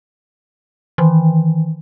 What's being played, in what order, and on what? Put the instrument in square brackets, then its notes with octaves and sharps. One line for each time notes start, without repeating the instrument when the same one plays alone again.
[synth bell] D#3 E3